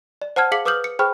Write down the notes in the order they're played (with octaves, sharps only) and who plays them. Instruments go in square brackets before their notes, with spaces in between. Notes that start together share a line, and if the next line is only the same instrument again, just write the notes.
[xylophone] D5
C5 F#5 A5 F6 G#6
G#4 F5 D6 B6 C#7 F#7
B4 D6 D#6 F6 G6 F#7
C#7
G#4 C5 G5 B5 C#6 F6